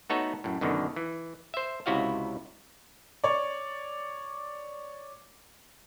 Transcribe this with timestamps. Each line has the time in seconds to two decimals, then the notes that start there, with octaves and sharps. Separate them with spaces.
0.10 A3 B3 D#4 F#4 A4 C#5
0.44 F#2 A2
0.61 F#2 B2 D3 D#3
0.96 E3
1.54 C5 E5
1.86 C#2 C3 E4 F#4 D#5 F5
3.24 C#5 D5